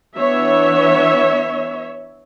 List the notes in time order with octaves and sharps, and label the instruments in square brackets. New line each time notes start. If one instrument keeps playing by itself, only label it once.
[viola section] E3 B3 D4 C#5 E5